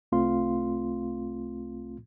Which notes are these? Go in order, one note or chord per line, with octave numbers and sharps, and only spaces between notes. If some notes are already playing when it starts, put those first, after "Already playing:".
C2 A3 C4 F4 F5 C6